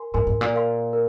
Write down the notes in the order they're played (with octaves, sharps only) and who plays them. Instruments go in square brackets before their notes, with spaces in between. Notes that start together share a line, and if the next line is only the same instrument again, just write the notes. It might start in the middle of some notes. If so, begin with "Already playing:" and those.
Already playing: [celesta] A#4 G#5 C6
[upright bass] G#2 [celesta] A#4 G#5 C6
[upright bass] G#2
A#2
[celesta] A#4 F5 C6
A#4